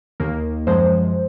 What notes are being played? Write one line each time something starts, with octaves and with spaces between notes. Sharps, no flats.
D#2 D#3 A#3
F#2 F3 G#3 C5